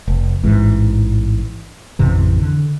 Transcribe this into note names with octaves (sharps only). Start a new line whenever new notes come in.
F1
A1 G#2 E3
A1 F2 C3 E3
D3